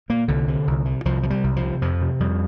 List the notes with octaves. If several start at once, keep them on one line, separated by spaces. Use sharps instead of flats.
A#2 A#3
C2 D3
C3
C2
C3
C2 F3
C3 F3
G3
C2
F3
C3
F2 F3
C3
F2 G3